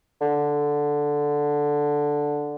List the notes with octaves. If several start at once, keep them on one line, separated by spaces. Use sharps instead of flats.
D3